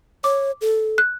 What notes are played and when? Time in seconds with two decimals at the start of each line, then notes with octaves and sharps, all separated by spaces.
0.24 C#5 D6
0.61 A4
0.98 F#6